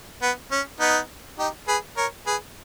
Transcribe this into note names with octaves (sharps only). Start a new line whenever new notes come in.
B3
C#4
B3 D#4
D#4 G4
G#4 B4
A#4 C#5
G#4 B4